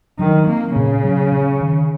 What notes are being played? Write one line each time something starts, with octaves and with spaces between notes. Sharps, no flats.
D#3 F#3
A#3 C4
A#2 C#3
F#3
C#4
D#3